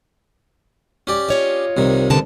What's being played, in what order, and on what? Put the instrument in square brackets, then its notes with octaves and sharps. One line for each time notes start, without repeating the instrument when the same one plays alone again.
[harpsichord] C#4 G4 D5
[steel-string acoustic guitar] F4 C#5 D#5
[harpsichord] C2 C3 D#3
[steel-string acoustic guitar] B2 D3 A5